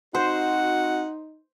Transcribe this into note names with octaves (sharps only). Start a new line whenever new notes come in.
C4 D#4 F#4 C5 F#5